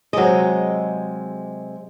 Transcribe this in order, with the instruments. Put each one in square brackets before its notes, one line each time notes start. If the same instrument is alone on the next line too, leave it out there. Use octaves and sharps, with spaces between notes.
[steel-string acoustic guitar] C3 G#3 [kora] F#3 D#5